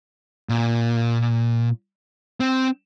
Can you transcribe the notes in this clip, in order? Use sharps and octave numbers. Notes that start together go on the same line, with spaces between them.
A#2
C4